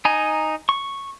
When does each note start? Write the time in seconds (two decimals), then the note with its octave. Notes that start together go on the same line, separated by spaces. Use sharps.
0.05 D#4 G#5 A#5
0.69 C#6